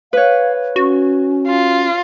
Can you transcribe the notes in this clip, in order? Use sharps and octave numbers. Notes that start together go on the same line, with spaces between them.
B4 C#5 F5
C#4 F#4
F4